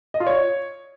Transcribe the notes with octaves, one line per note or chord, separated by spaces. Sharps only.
D#5
F4
C#5